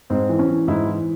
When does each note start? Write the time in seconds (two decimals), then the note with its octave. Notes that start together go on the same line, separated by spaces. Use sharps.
0.10 G#2 C4
0.29 E3
0.39 C#4
0.49 E3
0.68 G#2 E4
0.87 E3